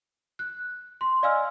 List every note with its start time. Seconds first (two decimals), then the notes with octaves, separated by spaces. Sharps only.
0.39 F#6
1.01 C6
1.23 D5 D#5 F5 G#5 E6 F6